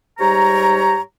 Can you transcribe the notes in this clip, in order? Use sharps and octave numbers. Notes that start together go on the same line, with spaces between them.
G#2 G3 G4 C#5 A#5